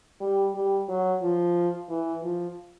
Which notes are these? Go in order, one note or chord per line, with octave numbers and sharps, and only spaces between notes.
G3
G3
F#3
F3
E3
F3